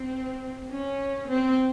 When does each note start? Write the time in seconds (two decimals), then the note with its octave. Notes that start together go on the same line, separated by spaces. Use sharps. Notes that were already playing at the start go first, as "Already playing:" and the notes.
Already playing: C4
0.71 C#4
1.28 C4